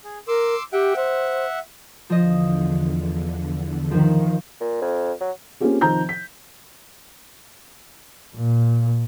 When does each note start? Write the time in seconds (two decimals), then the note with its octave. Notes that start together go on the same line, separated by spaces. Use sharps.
0.04 G#4
0.28 A#4 C6 D6 E6
0.73 G4 E5 F#5 G5
0.96 C5 E5 F#5
2.10 E2 D3 F3 D#5
3.91 D#3 F3
4.61 A#2
4.82 F2
5.21 F#3
5.60 A#3 C4 C#4 F4 G4 G#4
5.81 C3 D#3 F3 C5 A#5 G6
6.09 B6
8.35 A#2